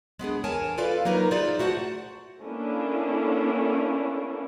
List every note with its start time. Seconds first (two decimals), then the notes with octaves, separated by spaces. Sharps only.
0.19 G#3 B3 D4 G#4
0.44 E2 G#4 A#4 C#5 G#5 A5
0.78 E4 F4 A4 B4 D5 F5
1.05 F#3 A#3 D#4 A#4 B4
1.31 D#4 F4 G#4 C5 D5 E5
1.59 A3 F#4 C5 D5 F#5 A5
2.41 A#3 B3 C#4 D4 E4 A4